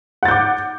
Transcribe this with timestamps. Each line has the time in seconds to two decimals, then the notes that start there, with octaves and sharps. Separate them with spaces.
0.23 F#5
0.25 A6
0.28 G6
0.31 D6